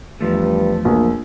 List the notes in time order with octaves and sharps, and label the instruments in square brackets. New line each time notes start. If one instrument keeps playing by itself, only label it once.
[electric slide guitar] E2 F3 A3 [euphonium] G2
[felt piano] A#1 [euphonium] A#3